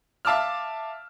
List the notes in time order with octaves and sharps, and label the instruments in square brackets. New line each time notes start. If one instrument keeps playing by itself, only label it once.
[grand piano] E5 F5 A5 D6 E6 F6